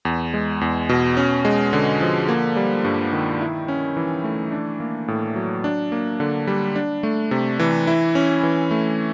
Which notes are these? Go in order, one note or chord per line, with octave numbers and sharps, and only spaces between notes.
E2
G#3
E2
B2
C#4
G#3
D3
F3
A#3
G3
G2
D#3
E4
C#4
E3
A3
D4
A#3
A2
F#3
D4
A#3
D3
G3
D4
A3
C3
E3
E4
C#4
E3
A3